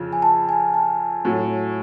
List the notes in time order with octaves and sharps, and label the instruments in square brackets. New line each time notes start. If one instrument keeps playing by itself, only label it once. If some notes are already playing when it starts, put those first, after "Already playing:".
Already playing: [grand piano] F2 C#3 F3
[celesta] G#5
A5
G#5
A5
[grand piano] A2 F#3 A3